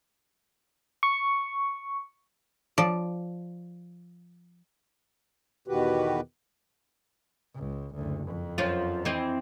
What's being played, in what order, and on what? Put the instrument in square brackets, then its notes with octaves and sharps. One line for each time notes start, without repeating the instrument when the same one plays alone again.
[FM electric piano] C#6
[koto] F3 D5
[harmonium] E2 B2 D#3 F#4 G4 B4
[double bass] C#2
F#1 D2
F2
[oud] F#2 F3 F4
E3 C4 D#5